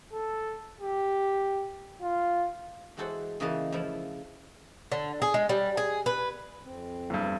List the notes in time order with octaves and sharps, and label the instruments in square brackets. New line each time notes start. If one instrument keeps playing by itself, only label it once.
[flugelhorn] A4
G4
F4
[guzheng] E3 G#3 F#4 A4 C5 F#5
C#3 E3 A#3 D#4 D#5 A5
F3 A3 E4
[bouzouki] D3
G#4
G#3
G3
G#4
B4
[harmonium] F2 C4
[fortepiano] E2 G2